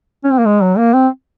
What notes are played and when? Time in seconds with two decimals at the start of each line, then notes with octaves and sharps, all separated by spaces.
0.24 C#4
0.31 C4
0.38 A#3
0.46 G#3
0.62 F#3
0.78 A#3
0.94 C4